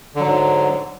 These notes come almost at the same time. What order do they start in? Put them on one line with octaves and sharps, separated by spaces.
D3 F#3 G#2